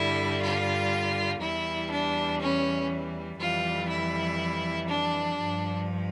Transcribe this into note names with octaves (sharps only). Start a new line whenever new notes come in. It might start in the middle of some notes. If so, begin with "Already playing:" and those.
Already playing: G2 D3 G3 E4
F4
E2 E3 G3 E4
D4
C#4
F2 E3 G3 F4
E4
D4
G2 F3